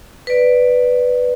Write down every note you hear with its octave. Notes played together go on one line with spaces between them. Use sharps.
B4 D5